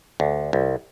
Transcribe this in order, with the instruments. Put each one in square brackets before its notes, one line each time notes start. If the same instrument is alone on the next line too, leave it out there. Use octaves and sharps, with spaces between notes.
[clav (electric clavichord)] D2
C2